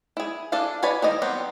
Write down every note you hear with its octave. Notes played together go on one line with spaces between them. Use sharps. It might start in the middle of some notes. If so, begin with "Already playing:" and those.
E4 G#4
D4 G#4 A4 D5 F5
B4 C#5 D5 G#5 B5
D#3 G3 D#5
F#3 G3 B3 C4